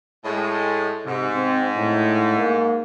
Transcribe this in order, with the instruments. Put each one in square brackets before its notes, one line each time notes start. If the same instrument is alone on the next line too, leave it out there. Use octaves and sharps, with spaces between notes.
[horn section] A2 G#3
[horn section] G#2 [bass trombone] C3
[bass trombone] C4
A2
A#3